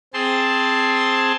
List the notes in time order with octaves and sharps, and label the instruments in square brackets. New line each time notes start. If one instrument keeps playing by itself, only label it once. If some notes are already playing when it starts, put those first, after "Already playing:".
[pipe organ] C4 G#4 A5 C6